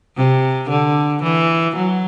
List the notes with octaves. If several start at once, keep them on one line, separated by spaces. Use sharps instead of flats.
C3
D3
E3
F#3